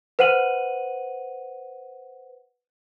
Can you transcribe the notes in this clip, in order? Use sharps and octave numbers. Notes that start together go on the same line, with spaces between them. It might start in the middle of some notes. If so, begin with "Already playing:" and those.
B4 C5 F#5 D#7 F#7